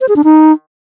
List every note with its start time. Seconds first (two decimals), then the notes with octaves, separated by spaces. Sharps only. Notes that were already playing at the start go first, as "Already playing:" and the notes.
0.01 C5
0.09 G#4
0.16 D4
0.24 D#4